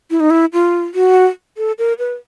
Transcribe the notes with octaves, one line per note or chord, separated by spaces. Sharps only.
E4
D#4
E4
F4
F#4
A4
A#4
B4